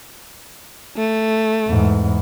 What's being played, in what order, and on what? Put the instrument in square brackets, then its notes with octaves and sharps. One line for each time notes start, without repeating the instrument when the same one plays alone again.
[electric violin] A3
[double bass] E2 G#2